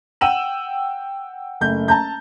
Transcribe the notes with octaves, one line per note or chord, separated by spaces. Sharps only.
F#5 G5 E6 D#7 E7 F#7
F#1 A3 G6
A5 A#5 G6